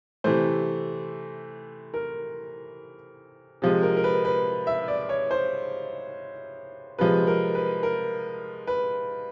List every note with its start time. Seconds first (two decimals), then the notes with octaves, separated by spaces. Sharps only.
0.24 C3 E3 A3 C5
1.94 A#4
3.62 C3 F3 G#3
3.83 A#4
3.97 A#4
4.04 B4
4.25 B4
4.67 E5
4.88 D5
5.09 C#5
5.31 C5
6.99 C3 F3 G#3 B4
7.27 A#4
7.55 B4
7.83 A#4
8.67 B4